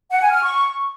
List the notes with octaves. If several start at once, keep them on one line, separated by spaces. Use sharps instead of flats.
F#5
G#5
F6
C#6